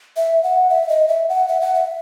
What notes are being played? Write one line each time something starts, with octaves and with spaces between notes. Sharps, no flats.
E5
F#5
E5
D#5
E5
F#5
E5
F#5
E5